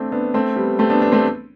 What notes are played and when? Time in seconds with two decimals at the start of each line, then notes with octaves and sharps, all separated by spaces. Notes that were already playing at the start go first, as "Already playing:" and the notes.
Already playing: A3 C4 D4
0.12 B3 D4
0.34 A3 C4
0.56 G3 B3
0.79 A3 C4
0.90 B3 D4
1.01 B3 D4
1.12 A3 C4